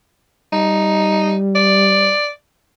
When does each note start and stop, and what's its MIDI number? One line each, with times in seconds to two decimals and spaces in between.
0.53 2.12 55
0.53 1.33 63
1.55 2.29 74